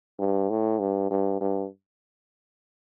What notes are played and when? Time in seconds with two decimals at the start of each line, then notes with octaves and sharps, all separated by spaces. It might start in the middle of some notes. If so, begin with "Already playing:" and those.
0.19 G2
0.50 A2
0.80 G2
1.11 G2
1.41 G2